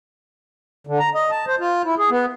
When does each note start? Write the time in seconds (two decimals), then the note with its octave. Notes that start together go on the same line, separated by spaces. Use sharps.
0.87 D3
0.99 A#5
1.15 D#5
1.31 A5
1.47 C5
1.60 F4
1.85 E4
1.98 G#4
2.10 B3